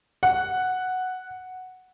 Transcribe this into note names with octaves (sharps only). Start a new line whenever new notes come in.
F#5